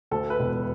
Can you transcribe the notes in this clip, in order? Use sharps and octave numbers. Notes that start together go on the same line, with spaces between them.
D2 A4
B4
E1